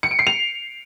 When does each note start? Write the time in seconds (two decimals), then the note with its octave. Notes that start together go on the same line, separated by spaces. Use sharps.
0.03 C#7
0.11 D7
0.19 C7
0.27 F7